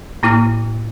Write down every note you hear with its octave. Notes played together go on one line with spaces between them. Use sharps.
A2 A#3 E4 D6 F6